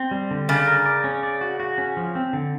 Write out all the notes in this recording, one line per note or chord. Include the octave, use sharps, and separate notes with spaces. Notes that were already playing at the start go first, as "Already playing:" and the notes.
Already playing: C4
G3
D3
C#3 D5
A#4
D5
C#4
D5
F#4
F#4
C#4
F3
C4
D3